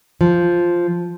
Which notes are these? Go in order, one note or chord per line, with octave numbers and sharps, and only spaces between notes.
F3